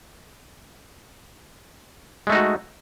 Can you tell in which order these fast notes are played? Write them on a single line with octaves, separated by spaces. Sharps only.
G#3 A3 D#4 F#4